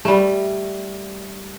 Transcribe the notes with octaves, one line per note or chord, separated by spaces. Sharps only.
G3 A3